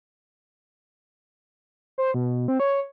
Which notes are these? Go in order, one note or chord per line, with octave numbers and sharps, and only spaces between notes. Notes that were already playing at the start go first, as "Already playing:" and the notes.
C5
B2
C4
C#5